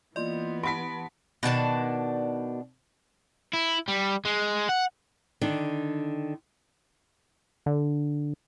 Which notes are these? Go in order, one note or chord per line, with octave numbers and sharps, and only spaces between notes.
E3 A#3 B3 F4 D5 D#5 C6
G4 F#5 A5 B5 B6 D7
B2 D#3 D4 A5
E4
G3
G#3
F#5
D3 D#3 D4
D3